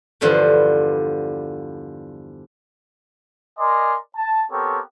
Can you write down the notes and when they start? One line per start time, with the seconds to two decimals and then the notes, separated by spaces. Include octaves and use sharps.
0.21 E2 G2 D3 F3 B3 C5
3.59 A#4 D5 D#5 G#5 C6
4.16 A5
4.51 B3 C4 G4 A4 A#4 C#5